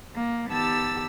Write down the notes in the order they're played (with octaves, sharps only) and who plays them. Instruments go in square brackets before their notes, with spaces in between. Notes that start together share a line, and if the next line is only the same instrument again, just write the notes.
[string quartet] A#3
D#3 B3 G4 A5 E6 A6